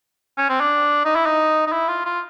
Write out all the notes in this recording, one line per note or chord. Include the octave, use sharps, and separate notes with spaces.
C#4
C4
D4
D#4
E4
D#4
D#4
E4
F4
F4